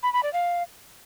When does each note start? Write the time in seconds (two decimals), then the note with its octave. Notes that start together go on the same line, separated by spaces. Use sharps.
0.03 B5
0.13 B5
0.23 D5
0.33 F5